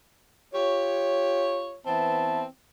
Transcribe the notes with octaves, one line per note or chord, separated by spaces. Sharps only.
F4 G4 C#5
E3 B3 C4 E5 A5